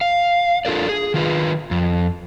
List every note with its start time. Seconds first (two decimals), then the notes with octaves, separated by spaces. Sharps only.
0.01 F5
0.65 D4 F4 A4 A#4 D5
0.89 G#4
1.14 D#3 F4 B4
1.71 F2